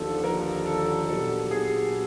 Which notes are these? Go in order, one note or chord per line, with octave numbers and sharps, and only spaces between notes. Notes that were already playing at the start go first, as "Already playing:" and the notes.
Already playing: D#2 D3 F3 A4
A#4
A4
A#2 F#3 B3 D4 G4 A4
G#4